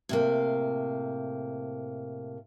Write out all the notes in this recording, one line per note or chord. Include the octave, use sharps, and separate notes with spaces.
A2 C3 A#3